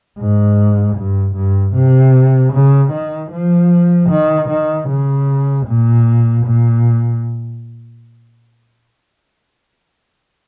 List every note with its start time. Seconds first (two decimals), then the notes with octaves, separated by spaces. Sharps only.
0.19 G#2
0.96 G2
1.35 G2
1.75 C3
2.53 C#3
2.92 D#3
3.32 F3
4.10 D#3
4.49 D#3
4.89 C#3
5.67 A#2
6.46 A#2